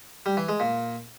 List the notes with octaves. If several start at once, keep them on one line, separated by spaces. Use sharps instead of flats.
G3
E3
G#3
A#2